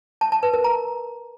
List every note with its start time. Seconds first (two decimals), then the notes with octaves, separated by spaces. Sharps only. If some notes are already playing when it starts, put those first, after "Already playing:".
0.21 A5
0.32 A5
0.43 B4
0.54 A#4
0.64 A#5